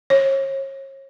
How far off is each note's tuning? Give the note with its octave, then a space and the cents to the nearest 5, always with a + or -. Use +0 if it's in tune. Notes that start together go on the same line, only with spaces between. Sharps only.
C#5 -40